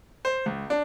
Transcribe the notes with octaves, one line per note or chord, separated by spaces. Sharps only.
C5
C#2
D4